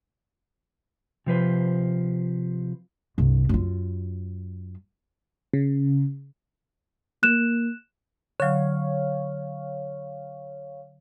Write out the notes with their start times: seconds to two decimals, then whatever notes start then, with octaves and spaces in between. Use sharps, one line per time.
1.26 C3 F3 B4 C5
3.18 C2 G2
3.49 F#2 F4
5.54 C#3
7.23 A#3 F#6 E7
8.40 D3 F#3 C#5 F5